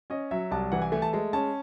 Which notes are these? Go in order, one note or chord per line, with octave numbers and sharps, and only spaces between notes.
C#4 D#5
F#3 E5
C2 A5
E3 F#5
G#5
A3 G#5
A5
G#3 A5
C#4 A5